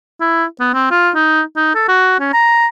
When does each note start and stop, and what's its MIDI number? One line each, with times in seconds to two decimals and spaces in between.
0.21 0.45 64
0.60 0.70 59
0.74 0.90 60
0.91 1.10 65
1.15 1.41 63
1.57 1.73 63
1.75 1.87 69
1.88 2.16 66
2.20 2.31 61
2.33 2.66 82